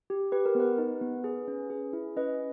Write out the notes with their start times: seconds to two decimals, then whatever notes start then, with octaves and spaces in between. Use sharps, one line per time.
0.10 G4
0.32 G4 B4
0.46 A#4
0.55 B3
0.60 B4
0.78 D#4
1.01 B3
1.24 G#4
1.48 C#4
1.70 G#4
1.93 E4
2.16 C#4 B4 D#5